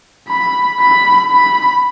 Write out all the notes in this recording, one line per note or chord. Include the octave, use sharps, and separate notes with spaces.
B5
B5
B5